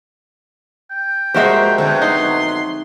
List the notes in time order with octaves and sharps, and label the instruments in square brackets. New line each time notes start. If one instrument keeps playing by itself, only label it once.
[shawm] G5
[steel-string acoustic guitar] F2 E5 [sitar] A#2 A#4 C5 [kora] G#3 F#4 G4
[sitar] D3 F#3 B3 [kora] C4
[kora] D#4 [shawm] C6